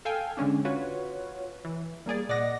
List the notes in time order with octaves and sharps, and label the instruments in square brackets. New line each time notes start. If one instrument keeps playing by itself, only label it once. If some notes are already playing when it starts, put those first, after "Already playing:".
[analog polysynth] A4 F5 G5 G#5
D3 G#3 C#4 D4
F4 F#4 B4 C#5
E3
G3 A#3 G#4 D5
A#2 D5 D#5 F#5 A#6